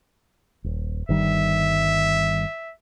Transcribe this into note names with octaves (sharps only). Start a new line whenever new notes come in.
D#1
G1 D#3 G3 E5